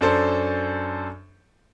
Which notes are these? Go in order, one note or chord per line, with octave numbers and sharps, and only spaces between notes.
F#2 D4 A4 C5